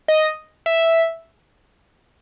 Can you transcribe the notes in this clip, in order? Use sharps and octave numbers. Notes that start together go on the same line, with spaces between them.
D#5
E5